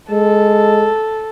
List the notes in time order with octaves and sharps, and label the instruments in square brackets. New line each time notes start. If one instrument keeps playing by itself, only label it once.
[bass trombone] G#3 [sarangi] A4